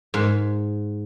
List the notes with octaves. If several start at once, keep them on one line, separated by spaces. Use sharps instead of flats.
G#2